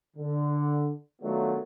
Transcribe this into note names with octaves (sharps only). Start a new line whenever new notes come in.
D3
D#3 F#3 A3 B3 D4 F4